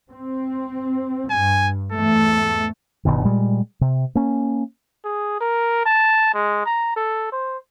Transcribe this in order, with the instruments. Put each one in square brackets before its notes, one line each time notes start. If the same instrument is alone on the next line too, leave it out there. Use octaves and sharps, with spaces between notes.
[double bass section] C4
[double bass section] G2 [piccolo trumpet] G#5
[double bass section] E2 G#2 A3 [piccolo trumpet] A4
[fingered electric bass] G1 C#2 B2 D#3
A#2 G3 G#3
C3
A#3 C#4
[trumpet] G#4
A#4
A5
G#3
A#5
A4
C5